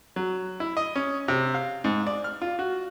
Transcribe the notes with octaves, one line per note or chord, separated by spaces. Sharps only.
F#3
E4
D#5
C#4
C3
F5
G#2
D5
F6
F4
F#4